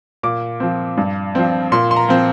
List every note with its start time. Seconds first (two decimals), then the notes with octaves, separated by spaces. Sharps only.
0.23 A#2 D6
0.60 F3 C4
0.97 G2
1.35 F3 C4
1.72 A#2 C6
1.91 C6
1.96 A#5
2.08 F3 C4